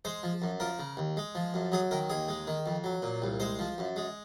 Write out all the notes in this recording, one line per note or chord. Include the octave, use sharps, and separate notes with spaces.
G#3 C5
F3
F#2
F3 A#4
C#3
D#2
G#3
F3
F#2
F#3 G#4
D#3 A#4
D#2 G#4
G#3
D#3
F2
F#3
A#2
C2
G#3 C5
F3
F#2
G#3